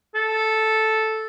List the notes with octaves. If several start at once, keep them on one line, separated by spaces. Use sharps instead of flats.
A4